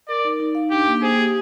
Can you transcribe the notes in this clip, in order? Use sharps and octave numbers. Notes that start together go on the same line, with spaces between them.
A#4 D5
D#4
D#4
F5
D4 G4
A#3
G#4 C5
G4